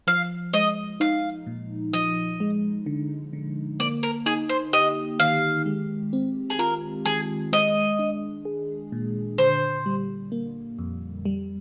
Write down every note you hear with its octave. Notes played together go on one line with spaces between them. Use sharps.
F3 F5
G#3 D#5
D#4 F5
A#2
F3 D#5
G#3
D3
D3
A#3 D5
A#4
D#4 G#4
C5
G4 D#5
D#3 F5
G#3
C4
G#4
F4 A#4
D#3 G#4
G#3 D#5
D4
G#4
A#2
D3 C5
G3
A#3
F2
G3